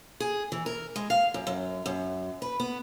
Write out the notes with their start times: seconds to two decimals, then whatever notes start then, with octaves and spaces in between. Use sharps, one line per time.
0.20 G#4
0.52 E3
0.66 A#4
0.96 G#3
1.10 F5
1.34 F#2
1.47 F#2
1.86 F#2
2.42 B4
2.60 B3